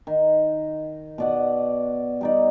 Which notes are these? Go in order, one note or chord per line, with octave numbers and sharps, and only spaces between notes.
D#3
B2 D5 F#5
G3 D#4 D5